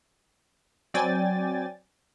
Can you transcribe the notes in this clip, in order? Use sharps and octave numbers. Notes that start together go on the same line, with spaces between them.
F#3 C4 D5 G5 G#5 A6